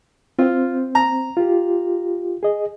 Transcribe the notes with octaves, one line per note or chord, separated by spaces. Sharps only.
C4 F4 C5
A#5
F4 G4
G#4 D#5